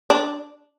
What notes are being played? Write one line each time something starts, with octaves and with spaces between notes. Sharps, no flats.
D4